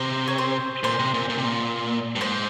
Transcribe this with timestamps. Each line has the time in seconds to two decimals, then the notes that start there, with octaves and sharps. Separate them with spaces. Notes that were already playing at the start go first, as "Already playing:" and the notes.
Already playing: C3 C5
0.28 C#5
0.38 C5
0.83 A#2 C5
0.99 C3
1.14 A#2
1.29 A#2
1.38 C3
1.45 A#2
2.16 G2
2.21 G#2 C5